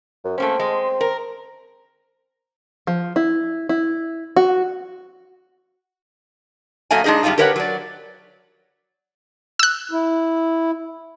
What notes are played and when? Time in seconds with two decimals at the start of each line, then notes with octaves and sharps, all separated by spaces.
0.25 F#2
0.38 A3 A#3 C4 C#4
0.59 G#3
1.01 A#4
2.87 F3
3.16 E4
3.69 E4
4.36 F#4
6.91 G2 F#3 A3 A#3 D#5 G#5
7.04 G#3 D4 D#4 G#4 D#5
7.23 F#2 G3 C4 D4 D#4 F4
7.38 G4 A#4 B4 C#5 E5 F#5
7.56 F#3 D5
9.59 E6 F#6
9.91 E4